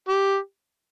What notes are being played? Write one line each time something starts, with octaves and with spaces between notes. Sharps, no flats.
G4